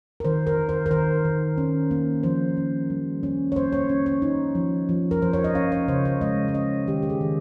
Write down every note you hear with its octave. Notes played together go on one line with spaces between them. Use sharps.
A#4
D#3 C5
A#4
D#3
C5
A#4
D#3 C5
D#3
C#4
A#3
F3 C5
C#4
G3
C#4
C#5
A#3 C5
C#5
C#4
C#5
D#4
F3
F3
A#4
F3 C5
C#5
D#5
C#4 F5
C#5
C#3 C5
C#5
G#3 D#5
C#5
C#4 D#5
D#3 G4
G4
G#4
D#3